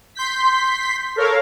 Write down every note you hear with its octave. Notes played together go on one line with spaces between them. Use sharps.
C6 G6 B6
A4 A#4 C#5 F5